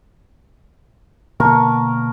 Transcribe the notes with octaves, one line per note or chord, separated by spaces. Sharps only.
B2 D3 A#3 A#4 A5 C#6